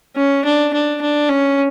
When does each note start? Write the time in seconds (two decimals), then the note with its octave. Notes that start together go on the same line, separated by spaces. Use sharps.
0.16 C#4
0.45 D4
0.73 D4
1.01 D4
1.29 C#4